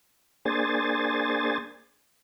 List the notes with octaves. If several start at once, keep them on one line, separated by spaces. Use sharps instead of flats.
A#3 D4 G#4 C5 G#5 A6